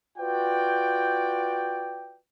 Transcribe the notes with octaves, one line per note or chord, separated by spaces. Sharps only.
F4 F#4 B4 D5 G5